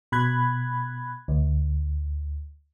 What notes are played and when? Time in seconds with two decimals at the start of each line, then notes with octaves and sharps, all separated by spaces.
0.12 B2 B5 F#6 G#6
1.28 D2